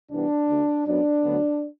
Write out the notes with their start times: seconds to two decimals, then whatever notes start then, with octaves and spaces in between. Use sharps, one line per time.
0.11 C2 C3 E3 G3 B3 D4
0.49 D2 D3 A3
0.86 F#2 F#3 B3 D4
1.23 D2 D3 F#3 B3